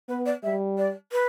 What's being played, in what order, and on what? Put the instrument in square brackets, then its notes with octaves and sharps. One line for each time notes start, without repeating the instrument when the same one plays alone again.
[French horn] B3 [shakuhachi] B4
[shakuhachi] D5
[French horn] G3 [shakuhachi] E5
[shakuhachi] D5
B4